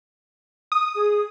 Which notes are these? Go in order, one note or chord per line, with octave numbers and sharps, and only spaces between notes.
D#6
G#4